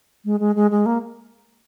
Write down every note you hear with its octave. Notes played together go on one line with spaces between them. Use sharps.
G#3
G#3
G#3
G#3
A#3